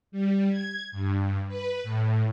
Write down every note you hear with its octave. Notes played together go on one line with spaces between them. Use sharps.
G3
G#6
G2
B4
A2